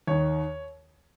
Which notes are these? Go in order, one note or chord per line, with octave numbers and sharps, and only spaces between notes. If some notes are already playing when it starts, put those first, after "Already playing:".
D#2 D#3 C#5